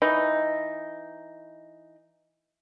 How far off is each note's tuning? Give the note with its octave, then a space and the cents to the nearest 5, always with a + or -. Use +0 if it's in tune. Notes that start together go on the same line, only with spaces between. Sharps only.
E3 +0 D#4 +0